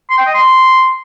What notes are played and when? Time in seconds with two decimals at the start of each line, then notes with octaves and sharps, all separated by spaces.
0.10 C6
0.18 G5
0.26 D#5
0.34 C6